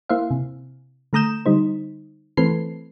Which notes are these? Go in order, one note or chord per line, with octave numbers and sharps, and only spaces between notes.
A#3 E4 C5 E5 F5
C3
D3 A3 A#5 D#6 G6 E7
D3 G3 D#4 C5
E3 A3 C4 A4 B4 C7